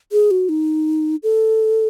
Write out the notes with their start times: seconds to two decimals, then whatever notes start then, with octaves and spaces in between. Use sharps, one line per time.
0.12 G#4
0.31 F#4
0.49 D#4
1.23 A4